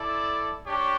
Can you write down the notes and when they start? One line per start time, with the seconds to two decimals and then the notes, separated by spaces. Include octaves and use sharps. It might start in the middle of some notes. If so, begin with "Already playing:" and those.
Already playing: E4 A4 D5
0.67 D4 G4 C#5